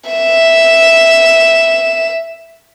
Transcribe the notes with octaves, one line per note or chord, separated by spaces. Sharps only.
E5 E7